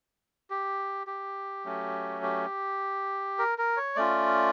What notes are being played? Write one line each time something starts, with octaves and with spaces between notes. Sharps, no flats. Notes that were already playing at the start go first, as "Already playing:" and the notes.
G4
G4
F#3 A3 C#4
G4
A#4
A#4
C#5
A3 C#4 F4 D5